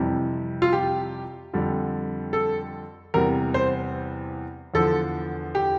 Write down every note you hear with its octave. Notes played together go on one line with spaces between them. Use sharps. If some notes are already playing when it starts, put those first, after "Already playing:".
Already playing: F2 C3 E3 G3
F4
G4
F2 D3 G3
A4
E2 C3 G3 A#4
C5
E2 D3 F3 A4
G4